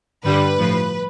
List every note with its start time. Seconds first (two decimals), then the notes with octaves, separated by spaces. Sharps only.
0.24 G2 D3 G3 B4
0.58 A2 F3